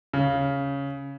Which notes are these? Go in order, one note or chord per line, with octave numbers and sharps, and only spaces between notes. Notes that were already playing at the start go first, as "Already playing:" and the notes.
C#3